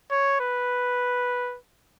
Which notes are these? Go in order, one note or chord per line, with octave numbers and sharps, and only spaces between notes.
C#5
B4